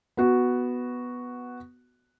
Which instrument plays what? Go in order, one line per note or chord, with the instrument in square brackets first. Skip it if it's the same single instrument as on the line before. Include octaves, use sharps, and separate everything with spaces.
[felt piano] B3 F#4